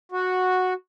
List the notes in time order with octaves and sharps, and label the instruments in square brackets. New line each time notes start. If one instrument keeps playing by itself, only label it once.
[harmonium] F#4